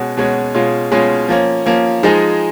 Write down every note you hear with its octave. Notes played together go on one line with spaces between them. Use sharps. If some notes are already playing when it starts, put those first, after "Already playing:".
Already playing: B2 G#3 C#4 F#4
B2 G#3 C#4 F#4
B2 G#3 C#4 F4
B2 G#3 C#4 F4
F3 A#3 C#4
F3 A#3 C#4
F3 G#3 D#4 G#4